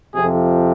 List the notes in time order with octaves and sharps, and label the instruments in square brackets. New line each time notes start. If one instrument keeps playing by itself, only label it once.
[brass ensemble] F2 C3 F3 G#4